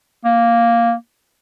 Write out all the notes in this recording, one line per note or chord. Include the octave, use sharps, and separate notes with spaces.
A#3